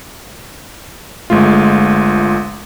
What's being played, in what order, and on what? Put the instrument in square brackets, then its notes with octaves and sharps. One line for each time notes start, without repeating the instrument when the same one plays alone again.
[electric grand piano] G1 G#3 A3 F4